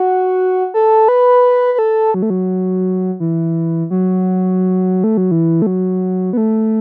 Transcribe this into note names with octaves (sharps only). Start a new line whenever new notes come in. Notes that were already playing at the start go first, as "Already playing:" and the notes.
Already playing: F#4
A4
B4
B4
A4
F#3
A3
F#3
E3
F#3
A3
F#3
E3
A3
F#3
B3
A3